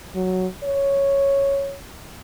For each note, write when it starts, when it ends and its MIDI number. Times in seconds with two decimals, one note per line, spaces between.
0.15 0.47 54
0.64 1.77 73